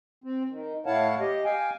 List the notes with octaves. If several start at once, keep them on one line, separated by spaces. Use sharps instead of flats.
C4
D#3
A2 E4 C#5 F5 F#5 A5
G4 D#5
F5 G5 G#5